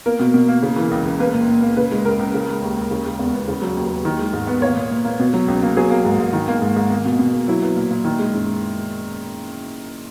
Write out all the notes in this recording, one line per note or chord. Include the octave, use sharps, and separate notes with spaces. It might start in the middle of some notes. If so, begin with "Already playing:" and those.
A#3 A#4
B2
B2
A#3
C#3
E3
C#2
C#2
A#3 B4
A#2
A#2
A#3
C#3 B4
G#3
C#2 A#4
C#2
C#3
G#3
D#2
D#2
C#3
G#3
E2
B3
C#3
F#3
D#2
D#2
D#3
G#3
G#2
B3
A#3 C#5
A#2
A#2
A#3
B2
F#3
C#2
A#3
F#3 G#4
A#3
G#2
G#2
D#3
A#3
G#2
G#2
A#3
B2
B2
A#3
F#3 E4
B3
A#2
A#2
D#3
G#3
F#2